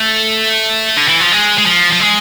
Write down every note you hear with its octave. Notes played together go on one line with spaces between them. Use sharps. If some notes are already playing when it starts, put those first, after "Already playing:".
Already playing: A3
D3
E3
F3
G#3
G#3
F3
F3
G#3